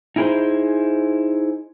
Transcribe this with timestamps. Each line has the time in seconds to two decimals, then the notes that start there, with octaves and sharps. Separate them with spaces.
0.16 D#4 E4 G#4 B4 C5